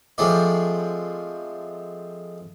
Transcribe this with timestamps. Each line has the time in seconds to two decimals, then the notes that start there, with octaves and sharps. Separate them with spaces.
0.18 F3 G#3 A3 C4 F4 D5